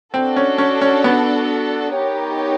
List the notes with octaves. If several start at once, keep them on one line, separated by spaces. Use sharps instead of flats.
C4 D4 F#4 A4
C#4
C#4
C#4
B3
D#4 G4 A#4 C#5